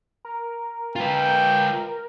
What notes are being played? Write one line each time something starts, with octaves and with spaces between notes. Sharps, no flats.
A#4
F4 B4 G5